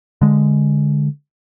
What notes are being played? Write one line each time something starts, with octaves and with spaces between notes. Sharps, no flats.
D3 G#3